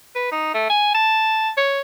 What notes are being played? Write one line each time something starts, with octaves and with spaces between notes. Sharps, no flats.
B4
D#4
A3
G#5
A5
C#5